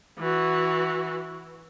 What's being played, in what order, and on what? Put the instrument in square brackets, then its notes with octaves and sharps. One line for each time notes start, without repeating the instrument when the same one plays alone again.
[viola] E3 F#4